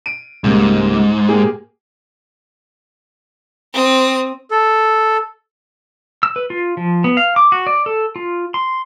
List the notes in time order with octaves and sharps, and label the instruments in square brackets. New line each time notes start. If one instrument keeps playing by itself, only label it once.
[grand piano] D7 D#7
[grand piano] C#2 G3 A#3 [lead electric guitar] G#2
[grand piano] A#3 G4 G#4
[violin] C4 D#6
[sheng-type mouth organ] A4
[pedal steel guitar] E6
B4
F4
F3
B3
F5
D6
F#4
D5
A4
F4
C6